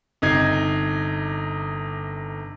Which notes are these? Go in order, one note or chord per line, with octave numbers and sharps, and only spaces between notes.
G1 C3 D#4 D#5 G#6 C7